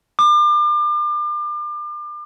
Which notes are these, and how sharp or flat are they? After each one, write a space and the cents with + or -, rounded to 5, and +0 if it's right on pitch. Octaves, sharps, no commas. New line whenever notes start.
D6 +35